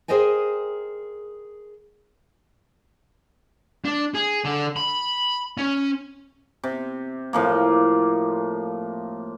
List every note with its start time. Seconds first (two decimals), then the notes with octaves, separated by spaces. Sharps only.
0.08 G#4 A#4 C5 D#5 G5 G#5
3.85 D4
4.15 G#4
4.45 D3
4.77 B5
5.58 C#4
6.64 C3
7.33 A2 F3 A#3